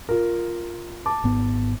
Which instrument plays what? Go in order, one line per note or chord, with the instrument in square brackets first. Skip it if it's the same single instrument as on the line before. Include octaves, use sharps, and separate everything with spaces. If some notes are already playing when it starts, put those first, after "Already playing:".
[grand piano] F4 A#4
A5 D6
[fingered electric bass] G#1 G#2 B3